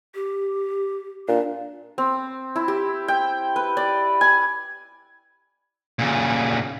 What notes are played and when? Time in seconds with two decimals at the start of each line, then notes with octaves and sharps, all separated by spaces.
0.15 G4
1.28 A#2 D4
1.98 C4
2.56 E4
2.68 G4
3.08 G5
3.56 B4
3.77 D5
4.21 G#5
5.99 A#2 C#3